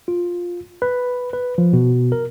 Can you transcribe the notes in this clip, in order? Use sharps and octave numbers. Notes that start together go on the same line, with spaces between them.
F4
B4
B4
F3
B2
A#4